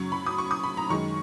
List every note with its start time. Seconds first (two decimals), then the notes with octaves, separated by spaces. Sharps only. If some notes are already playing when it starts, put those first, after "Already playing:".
Already playing: F#2 C#3 F#3 C#6
0.12 B5
0.26 D#6
0.38 C#6
0.51 D#6
0.63 B5
0.77 A#5
0.89 F#2 D#3 G#3 C#6